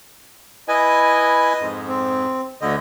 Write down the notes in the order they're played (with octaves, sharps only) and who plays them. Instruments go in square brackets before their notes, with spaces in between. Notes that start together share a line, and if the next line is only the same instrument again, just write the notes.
[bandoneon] E4 B4 G#5 [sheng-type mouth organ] D#5
[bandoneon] F2 G#2
[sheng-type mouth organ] C4
[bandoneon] D2 D3 [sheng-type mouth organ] D#5